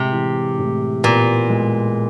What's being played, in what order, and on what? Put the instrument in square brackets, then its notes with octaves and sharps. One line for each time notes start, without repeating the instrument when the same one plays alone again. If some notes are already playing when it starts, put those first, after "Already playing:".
Already playing: [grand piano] A2 G#3 [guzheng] C3
[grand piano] E3
A2
[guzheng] A#2 [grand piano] B3
[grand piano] G#3